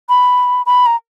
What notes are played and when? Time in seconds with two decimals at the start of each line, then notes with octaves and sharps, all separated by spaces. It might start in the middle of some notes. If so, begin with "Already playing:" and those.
0.09 B5
0.66 B5
0.86 A#5